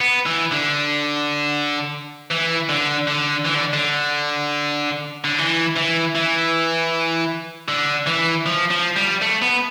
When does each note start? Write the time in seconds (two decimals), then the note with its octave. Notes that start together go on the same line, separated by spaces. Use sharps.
0.01 B3
0.26 E3
0.52 D3
2.31 E3
2.69 D3
3.07 D3
3.45 E3
3.55 D3
3.73 D3
5.25 D3
5.38 E3
5.76 E3
6.15 E3
7.68 D3
8.06 E3
8.46 F3
8.71 F3
8.97 G3
9.22 A3
9.42 B3